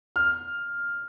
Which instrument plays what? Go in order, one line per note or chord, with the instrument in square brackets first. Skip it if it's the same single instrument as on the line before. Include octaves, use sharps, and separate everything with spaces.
[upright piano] F6